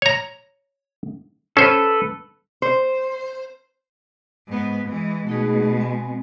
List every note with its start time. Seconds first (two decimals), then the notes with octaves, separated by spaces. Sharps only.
0.02 C#5 A#5
1.57 C#4 A4 B4 C5
2.62 C5
4.48 G#2 B3
4.89 E3 G#3
5.27 B2 G#3 A3 D#4 G#4
5.80 C4 G#5